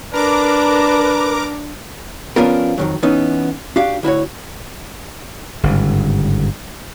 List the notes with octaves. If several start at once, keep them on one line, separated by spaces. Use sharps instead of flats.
D4 A#4 B4 A#5 D6
F3 B3 C#4 D4 F4 A#4
F2 D#3 F#3
E3 B3 C#4 D#4
D4 F#4 G4 F5
D2 E4 F#4 C#5
G1 G#2 C#3